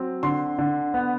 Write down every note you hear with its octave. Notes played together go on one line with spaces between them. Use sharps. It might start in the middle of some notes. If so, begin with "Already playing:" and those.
Already playing: F#3 C4
D3 C6
D3
B3